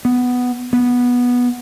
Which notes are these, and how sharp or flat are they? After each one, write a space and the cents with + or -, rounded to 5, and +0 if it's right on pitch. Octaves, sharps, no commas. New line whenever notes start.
B3 +5
B3 -10